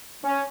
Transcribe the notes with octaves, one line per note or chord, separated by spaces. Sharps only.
C#4